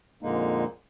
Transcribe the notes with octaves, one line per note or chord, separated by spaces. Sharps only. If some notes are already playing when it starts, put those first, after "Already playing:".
F2 A#2 D3 G#3 A#3 D#4